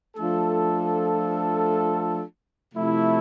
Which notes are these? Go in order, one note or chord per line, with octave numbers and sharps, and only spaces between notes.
F3 A3 D4 F4 A4
C3 F3 A3 E4